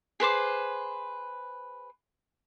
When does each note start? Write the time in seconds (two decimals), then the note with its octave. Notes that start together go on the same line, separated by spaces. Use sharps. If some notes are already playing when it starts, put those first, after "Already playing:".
0.20 G#4 B4 C5 D6